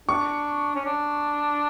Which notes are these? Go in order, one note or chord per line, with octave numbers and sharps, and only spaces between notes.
D4 C#6
C#4
D4